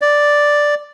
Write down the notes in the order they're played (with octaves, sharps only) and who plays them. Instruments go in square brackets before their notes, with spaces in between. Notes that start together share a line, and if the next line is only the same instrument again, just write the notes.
[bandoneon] D5